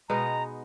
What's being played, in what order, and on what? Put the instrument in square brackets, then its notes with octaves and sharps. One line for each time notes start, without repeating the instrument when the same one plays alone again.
[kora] B2 G#3 B3 D#4 [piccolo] A#5